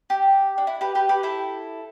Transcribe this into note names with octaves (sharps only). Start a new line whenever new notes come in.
G4
D4
E4
G4 B4
G4 B4
G4 B4
E4 A4